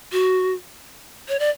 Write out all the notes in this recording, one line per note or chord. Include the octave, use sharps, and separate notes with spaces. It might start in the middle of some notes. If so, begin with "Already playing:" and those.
F#4
C#5
D5